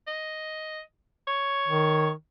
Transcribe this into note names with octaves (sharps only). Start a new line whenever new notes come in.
D#5
C#5
D#3